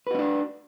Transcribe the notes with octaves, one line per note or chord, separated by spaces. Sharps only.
C#4 D4 F#4 B4